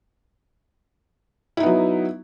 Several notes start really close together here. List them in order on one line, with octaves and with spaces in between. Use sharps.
E4 D#4 B3 F#3